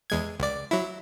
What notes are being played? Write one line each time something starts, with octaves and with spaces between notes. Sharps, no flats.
E2 G#3 G#6
C#2 D5
F#3 E4